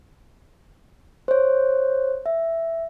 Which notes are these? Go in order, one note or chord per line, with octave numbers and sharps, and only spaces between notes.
C5 C#5
E5